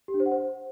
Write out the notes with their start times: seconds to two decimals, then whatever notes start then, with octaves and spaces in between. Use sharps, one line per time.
0.08 G4
0.14 D4
0.20 C5
0.26 F#5
0.32 C5